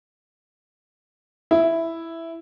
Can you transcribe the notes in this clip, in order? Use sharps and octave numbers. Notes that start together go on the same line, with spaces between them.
E4